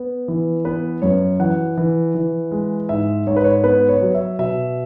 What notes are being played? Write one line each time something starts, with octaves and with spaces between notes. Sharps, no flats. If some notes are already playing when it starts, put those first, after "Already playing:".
Already playing: B3
E3
B3 B4
F#2 C#5
E3 F#5
E3
E3
G#3
G#2 E5
G#2 C#5
B4
C#5
B3 B4
C#5
F#3
E5
B2 E5